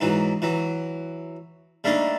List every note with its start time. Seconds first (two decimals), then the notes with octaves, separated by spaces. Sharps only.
0.01 G#2 E3 F#3
0.42 E3 F#3
1.84 G3 A3 A#3 D4 D#4